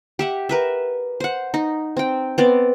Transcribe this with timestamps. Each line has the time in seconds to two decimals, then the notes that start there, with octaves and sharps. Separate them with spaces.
0.19 G4 E5 F#5
0.49 A#4 B4 E5
1.20 C5 F#5
1.54 D#4
1.97 C4 G5
2.38 B3 C4 D5